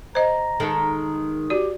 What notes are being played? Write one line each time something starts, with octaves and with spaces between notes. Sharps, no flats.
C5 D#5 A#5
D#3 G#3 A4
F#4 G4 D5